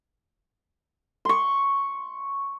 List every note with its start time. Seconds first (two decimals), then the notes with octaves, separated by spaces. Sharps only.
1.25 C6 C#6